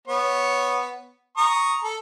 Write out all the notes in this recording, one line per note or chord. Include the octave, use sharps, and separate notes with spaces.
B3 C#5
A#5 C#6 D#6
A4